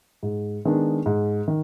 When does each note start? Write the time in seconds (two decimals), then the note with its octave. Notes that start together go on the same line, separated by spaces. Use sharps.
0.23 G#2
0.65 D#3 G#3 B3 D4
1.06 G#2
1.48 D#3